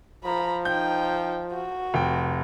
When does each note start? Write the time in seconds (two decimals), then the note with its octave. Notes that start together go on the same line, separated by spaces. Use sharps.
0.24 F3 A#5 B5
0.65 D#4 G5 G6
1.53 F#4
1.94 F1 G5